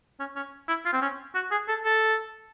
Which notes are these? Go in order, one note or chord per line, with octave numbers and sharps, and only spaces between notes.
C#4
C#4
E4
F4
C4
C#4
F#4
G#4
A4
A4